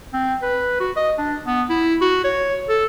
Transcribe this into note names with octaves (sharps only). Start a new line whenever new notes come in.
C4
B4
F#4
D#5
D4
B3
E4
F#4
C#5
A4